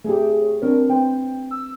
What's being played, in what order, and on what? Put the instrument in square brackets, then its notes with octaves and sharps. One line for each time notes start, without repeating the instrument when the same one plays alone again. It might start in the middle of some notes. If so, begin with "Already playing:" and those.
[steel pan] A3 G4 [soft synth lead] G#4
[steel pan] C#5
[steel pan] C4 D4 C#5 [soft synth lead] A#4
[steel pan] C4 B4 C5 [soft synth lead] G5
[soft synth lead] E6